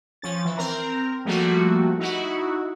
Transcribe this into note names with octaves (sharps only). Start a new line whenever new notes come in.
F3 C#4 A6
E3
C4 A#4 A#5
F3 G3 A3 A#3 F#4
D#4 E4 F#4